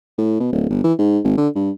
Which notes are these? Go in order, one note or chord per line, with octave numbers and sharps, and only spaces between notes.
A2
B2
D1
G1
E3
G#2
G#1
D3
G2